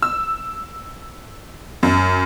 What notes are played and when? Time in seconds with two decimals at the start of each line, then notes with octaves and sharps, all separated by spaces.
0.02 E6
1.83 F#2